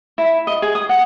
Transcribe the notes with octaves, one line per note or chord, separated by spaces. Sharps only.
E4
D#5
G#4
D#6
F#5